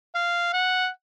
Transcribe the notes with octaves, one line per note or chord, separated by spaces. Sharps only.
F5
F#5